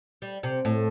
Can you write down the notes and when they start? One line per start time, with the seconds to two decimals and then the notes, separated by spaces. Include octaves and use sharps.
0.22 G3
0.43 C3
0.65 A2